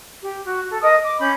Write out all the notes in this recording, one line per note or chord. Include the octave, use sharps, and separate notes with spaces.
G4
F#4
A4
A#4 D#5 D#6
D6
C#4 B5 G6